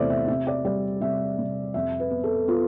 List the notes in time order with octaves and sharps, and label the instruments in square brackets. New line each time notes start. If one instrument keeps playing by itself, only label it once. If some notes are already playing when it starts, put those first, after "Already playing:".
Already playing: [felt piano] E2 C3 E3 A3 C5 D5 E5
E5
C3 E5
D5
G3 D5
C3 E5
C3
F2 E5
B4
B3
A4
B3 F4